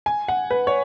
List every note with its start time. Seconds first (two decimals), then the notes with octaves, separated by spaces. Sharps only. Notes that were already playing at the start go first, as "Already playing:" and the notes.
0.06 G#5
0.28 F#5
0.51 B4
0.67 C#5